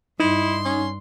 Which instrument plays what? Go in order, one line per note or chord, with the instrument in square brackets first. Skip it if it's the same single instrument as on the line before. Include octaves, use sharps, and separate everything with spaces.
[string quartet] G2 C6 [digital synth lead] D#4 [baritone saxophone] E4
[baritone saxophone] C#4